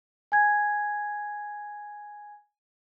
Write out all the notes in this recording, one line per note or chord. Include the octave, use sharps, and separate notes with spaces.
G#5 G#6